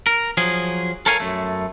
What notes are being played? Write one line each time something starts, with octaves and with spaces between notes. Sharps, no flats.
A#4
F3 F#3 G#4
A4 A#4 C#5 F5 G#5
F#2 A3